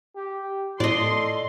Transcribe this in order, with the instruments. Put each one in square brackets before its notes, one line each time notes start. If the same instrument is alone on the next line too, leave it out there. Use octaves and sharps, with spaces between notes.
[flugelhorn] G4
[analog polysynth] A2 [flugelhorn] A4 [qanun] D5 D#5 [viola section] C6